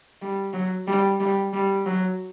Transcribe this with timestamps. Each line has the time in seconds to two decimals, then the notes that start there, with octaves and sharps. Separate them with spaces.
0.22 G3
0.54 F#3
0.88 G3
1.20 G3
1.53 G3
1.86 F#3